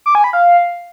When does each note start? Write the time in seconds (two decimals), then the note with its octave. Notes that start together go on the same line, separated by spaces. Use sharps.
0.06 D6
0.15 G#5
0.24 B5
0.33 F5